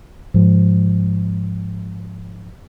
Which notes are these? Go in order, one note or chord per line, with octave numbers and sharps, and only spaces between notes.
G#2 F3